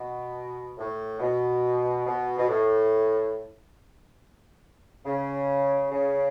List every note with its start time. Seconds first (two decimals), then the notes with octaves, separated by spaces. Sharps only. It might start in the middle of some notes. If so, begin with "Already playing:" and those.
Already playing: B2
0.78 A2
1.20 B2
2.06 B2
2.38 B2
2.49 A2
5.06 C#3
5.91 C#3